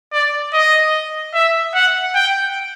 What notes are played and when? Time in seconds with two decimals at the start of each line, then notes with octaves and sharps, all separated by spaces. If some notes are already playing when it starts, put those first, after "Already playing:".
0.13 D5
0.53 D#5
1.34 E5
1.74 F#5
2.15 G5